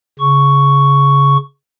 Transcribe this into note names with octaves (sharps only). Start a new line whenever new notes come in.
C#3 C#6